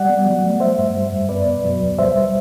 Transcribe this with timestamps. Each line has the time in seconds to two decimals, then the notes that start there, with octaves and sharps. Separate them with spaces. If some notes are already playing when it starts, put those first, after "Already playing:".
Already playing: G3 D5 F#5
0.10 B3
0.26 F#3
0.44 A3
0.60 G3 C5 E5
0.78 G2
0.95 G3
1.13 F#2
1.29 B3 B4 D5
1.47 B2
1.65 F#3
1.82 D2
1.99 G3 C5 E5